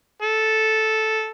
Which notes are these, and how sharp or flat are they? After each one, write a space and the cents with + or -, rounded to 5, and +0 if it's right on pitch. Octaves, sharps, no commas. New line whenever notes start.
A4 -5